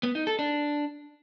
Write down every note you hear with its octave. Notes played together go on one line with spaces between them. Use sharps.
B3
D#4
A4
D4